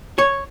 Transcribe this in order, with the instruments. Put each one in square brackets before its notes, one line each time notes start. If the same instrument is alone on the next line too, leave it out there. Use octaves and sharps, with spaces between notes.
[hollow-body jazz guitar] C#5